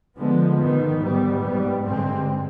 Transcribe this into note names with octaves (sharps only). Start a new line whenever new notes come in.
D3 F3 G#3 B3
G#2 D#3 B3
G#2 G3 B3
G#2 G3 B3
G2 D3 G#3 C4